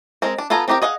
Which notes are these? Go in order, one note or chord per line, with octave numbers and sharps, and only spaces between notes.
G#3 C4 A#4
D4
B3 F4 A4 G#5 A#5
C4 D#4 G4 A#4 G5
G#4 D#5 F5 F#5